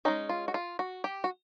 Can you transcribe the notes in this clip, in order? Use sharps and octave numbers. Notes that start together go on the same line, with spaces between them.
G#3 C#4 D#4
F4
F#4
F4
F#4
G4
F#4